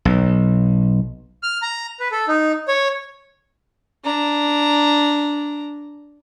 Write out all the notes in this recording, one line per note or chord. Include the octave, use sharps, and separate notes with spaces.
B1
F6
A#5
B4
A4
D#4
C#5
D4 A#5